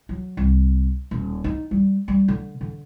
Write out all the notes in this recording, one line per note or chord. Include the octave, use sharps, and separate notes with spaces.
F#3
C2
D#1
D#4
G3
G3
D3
D3